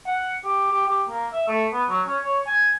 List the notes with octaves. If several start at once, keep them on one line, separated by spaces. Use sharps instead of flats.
F#5
G4
G4
G4
A#3
E5
A3
B3
F#3
C#4
C#5
G#5